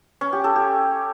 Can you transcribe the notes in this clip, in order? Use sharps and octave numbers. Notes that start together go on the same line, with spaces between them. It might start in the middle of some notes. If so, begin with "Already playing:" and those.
C#4
G4
A4
G4